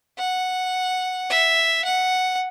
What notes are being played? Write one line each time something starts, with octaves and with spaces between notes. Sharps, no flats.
F#5
E5
F#5